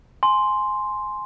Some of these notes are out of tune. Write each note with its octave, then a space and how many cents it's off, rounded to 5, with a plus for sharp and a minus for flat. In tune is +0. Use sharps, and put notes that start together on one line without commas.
G#5 +15 C6 +0